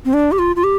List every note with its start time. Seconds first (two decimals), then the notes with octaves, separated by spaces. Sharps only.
0.05 C4
0.14 D4
0.32 G4
0.39 F4
0.56 F4
0.64 G4